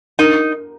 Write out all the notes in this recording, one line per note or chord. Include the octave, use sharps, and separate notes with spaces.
D#4 A#4